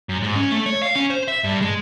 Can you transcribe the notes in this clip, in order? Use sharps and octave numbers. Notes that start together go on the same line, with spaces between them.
F#2
G#2
C#4
A3
C#5
F5
C#4
C5
E5
G2
G#3